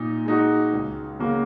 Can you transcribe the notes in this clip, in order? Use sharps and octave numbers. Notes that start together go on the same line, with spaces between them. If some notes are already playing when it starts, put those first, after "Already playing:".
Already playing: A#2 D#4
G#3 D#4 F#4
C#2
C#3 A#3 F#4